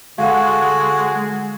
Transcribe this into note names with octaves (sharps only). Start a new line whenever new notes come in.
D3 G#3 F#4 F5 F#5